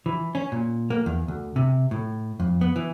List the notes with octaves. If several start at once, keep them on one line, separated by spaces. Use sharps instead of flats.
E3
C#4
A#2
A#3
E2
D2
C3
A2
F2
B3
E3